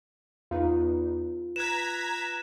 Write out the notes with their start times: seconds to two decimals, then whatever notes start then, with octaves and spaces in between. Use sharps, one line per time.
0.51 E2 D#4 F4 B4
1.56 B4 A#5 F#6 G#6 B6 E7